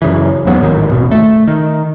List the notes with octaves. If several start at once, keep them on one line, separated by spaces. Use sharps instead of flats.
F#2 C#3 E3
D#2 G#2 F#3 B3
A1 G#2 D#3
D#1 G#1 B2
A3
D#3